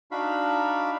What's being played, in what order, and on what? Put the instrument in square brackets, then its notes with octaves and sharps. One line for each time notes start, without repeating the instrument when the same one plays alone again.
[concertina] D4 D#4 F#4 F5 B5